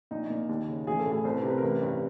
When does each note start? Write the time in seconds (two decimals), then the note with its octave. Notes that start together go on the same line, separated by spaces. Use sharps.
0.11 A#1 D#4
0.30 A#2
0.49 D#2
0.68 C#3
0.87 A1 G#4
1.00 A4
1.06 A2
1.12 G#4
1.25 C2 C5
1.37 B4
1.43 C3
1.50 B4
1.58 A#4
1.62 A1 B4
1.82 G2